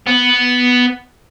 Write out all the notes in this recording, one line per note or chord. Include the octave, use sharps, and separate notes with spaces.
B3